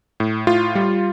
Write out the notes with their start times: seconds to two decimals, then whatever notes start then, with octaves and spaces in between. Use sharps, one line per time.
0.20 A2
0.47 A2 F4
0.75 G3